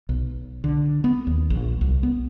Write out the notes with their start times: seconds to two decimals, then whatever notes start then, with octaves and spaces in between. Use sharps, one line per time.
0.09 B1
0.64 D3
1.04 B3
1.27 D#2
1.50 A#1
1.81 C2
2.03 B3